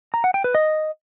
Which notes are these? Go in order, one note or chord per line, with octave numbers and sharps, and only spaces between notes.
A#5
F#5
G5
B4
D#5